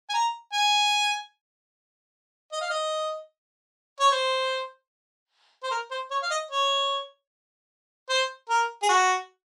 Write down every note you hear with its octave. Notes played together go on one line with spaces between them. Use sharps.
G#5
A#5
G#5
D#5
F5
D#5
C#5
C5
C5
A#4
C5
C#5
F5
D#5
C#5
C5
A#4
G#4
F#4